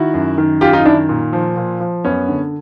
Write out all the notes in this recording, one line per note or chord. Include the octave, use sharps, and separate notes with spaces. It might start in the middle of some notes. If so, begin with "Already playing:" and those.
Already playing: D#3 E4 F#4
F#2
D#3
F#2 F4 G4
D#4 F4
D#3 D4 E4
A#2
F3
A#2
F3
F#2 B3 C#4
D3